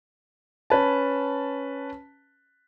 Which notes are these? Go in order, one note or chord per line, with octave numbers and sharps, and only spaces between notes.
C#4 B4 A5